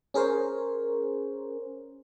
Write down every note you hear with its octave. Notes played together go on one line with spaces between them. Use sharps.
C#4 G#4 A#4 C5 C#5